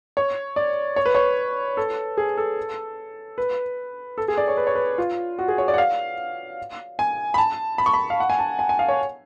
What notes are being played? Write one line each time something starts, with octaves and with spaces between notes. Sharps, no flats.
C#5
D5
C#5
B4
C#5
A4
G#4
A4
B4
A4
G#4
D5
C#5
B4
C#5
B4
F4
F#4
G#4
C#5
D5
F#5
F5
G#5
B5
A5
B5
C#6
B5
F5
F#5
G#5
A5
G#5
G#5
F5
C#5